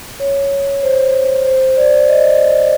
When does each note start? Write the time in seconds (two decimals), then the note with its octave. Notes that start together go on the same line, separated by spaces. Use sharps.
0.20 C#5
0.83 C5
1.45 C5
1.77 D5
2.08 D#5